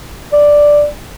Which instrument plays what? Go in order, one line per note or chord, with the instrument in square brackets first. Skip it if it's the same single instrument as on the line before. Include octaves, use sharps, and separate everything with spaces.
[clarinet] D5